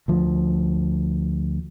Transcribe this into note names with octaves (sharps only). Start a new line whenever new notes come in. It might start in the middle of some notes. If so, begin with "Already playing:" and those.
D2 F3